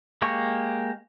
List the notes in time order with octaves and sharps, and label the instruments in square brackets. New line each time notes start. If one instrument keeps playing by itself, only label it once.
[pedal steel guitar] G#3 A#3 G4 C#6